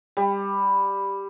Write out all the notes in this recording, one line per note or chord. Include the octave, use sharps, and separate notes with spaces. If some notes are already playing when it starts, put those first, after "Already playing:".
G3